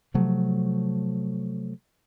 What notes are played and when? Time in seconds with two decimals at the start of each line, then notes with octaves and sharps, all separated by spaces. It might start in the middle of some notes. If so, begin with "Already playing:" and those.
0.14 C3 F3 F#3 A3